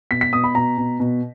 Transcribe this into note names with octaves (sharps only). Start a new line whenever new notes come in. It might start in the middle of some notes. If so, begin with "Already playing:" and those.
B2 B6
B6
B2 D#6
B5
B2 A#5
B2
B2